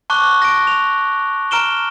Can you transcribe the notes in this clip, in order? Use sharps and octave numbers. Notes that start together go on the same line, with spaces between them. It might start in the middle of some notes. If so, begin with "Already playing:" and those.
A5 C#6 D6 F#6 G7
A#6 D7
F7
A#5 F6 D7 E7 G7